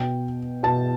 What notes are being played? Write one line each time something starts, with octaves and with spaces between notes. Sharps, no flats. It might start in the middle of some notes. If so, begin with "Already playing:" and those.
Already playing: B2 G5
B2 A5